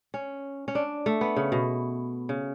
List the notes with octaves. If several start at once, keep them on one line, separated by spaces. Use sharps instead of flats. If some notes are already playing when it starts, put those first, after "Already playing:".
C#4
C#4
D4
A3
B3
C#3
B2
C#3